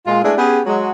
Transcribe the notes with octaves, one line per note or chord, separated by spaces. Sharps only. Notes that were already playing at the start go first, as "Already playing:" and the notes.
A#2 G#3 F4
G#3 A3 B3 D4 E4 G#4
B3 C#4 G4 G#4
F#3 G#3